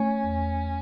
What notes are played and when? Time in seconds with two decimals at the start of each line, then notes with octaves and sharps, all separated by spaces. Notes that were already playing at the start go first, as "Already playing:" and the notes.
Already playing: A3 C#4
0.24 E2